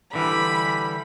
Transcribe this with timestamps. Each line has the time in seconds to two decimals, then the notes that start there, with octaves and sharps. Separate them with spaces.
0.13 D3 E3 G3 B5